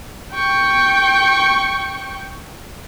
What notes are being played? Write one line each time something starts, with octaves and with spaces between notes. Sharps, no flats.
G5 C#6